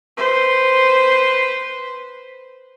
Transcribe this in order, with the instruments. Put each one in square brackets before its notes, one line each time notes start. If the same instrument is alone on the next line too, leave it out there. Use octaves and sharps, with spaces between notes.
[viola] B4 C5